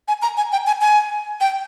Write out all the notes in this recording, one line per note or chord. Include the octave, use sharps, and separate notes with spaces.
G#5
A#5
G#5
G5
G#5
G#5
G5